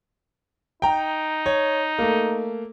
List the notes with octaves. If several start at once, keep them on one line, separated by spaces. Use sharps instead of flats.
D#4 G5 A#5
C#5
A3 A#3